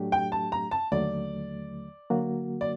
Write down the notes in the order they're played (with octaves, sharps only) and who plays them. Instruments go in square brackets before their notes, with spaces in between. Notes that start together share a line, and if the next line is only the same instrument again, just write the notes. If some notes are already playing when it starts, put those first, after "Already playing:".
Already playing: [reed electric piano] A2 F#3 A3 D4 G4
[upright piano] G5
A5
A#5
A5
[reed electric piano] D#2 D3 F#3 A3 [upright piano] D5
[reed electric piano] D3 F#3 A#3 F#4
[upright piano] D5